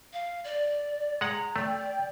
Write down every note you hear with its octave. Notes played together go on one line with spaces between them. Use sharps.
F5
D5
G#3 F#5 A#5
A3 D5 G5